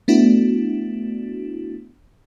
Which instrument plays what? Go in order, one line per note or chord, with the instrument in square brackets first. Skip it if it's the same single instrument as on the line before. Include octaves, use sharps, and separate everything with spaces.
[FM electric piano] A3 B3 D4 E4 F#4